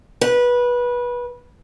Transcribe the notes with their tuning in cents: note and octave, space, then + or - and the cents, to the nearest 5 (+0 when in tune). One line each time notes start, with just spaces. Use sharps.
B4 -20